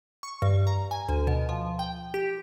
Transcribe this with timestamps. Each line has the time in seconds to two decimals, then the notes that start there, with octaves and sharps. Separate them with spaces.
0.23 C#6
0.42 G2
0.67 A#5
0.91 G#5
1.09 D2
1.27 B2
1.49 F3
1.79 G5
2.14 G4